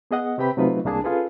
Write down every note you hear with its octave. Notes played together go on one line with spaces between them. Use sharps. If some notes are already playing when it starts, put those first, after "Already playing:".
B3 G#4 D#5 F#5
C3 C4 G4 B4 G5 B5
C3 F#3 A3 D#4 F4 B4
C2 A#3 D4 G#4 A5
C#4 F4 G#4 A4 B4